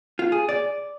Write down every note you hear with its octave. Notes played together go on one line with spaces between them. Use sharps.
F4
G#4
D5